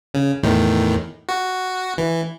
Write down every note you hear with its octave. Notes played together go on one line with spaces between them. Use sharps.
C#3
E2 A2 D#3
F#4
E3